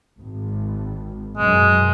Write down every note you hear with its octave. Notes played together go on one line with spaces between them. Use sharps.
G#1
F#2 B2 G#3